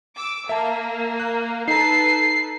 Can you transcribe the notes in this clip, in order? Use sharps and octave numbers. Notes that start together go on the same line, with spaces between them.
D6 E6
A#3 E5 A5
F#6
D#4 A4 B4 A#5 C7